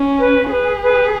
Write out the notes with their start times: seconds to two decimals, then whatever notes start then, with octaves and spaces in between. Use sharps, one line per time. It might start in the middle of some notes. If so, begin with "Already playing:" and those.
Already playing: C#4
0.19 B4
0.50 G#4 B4
0.82 B4